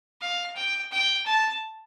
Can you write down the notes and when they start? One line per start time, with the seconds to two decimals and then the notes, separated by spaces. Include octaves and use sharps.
0.21 F5
0.56 G5
0.92 G5
1.26 A5